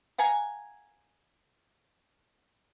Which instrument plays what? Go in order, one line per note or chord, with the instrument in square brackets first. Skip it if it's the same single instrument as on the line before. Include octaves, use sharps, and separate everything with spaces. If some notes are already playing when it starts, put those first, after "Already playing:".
[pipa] F5 F#5 G#5 A#5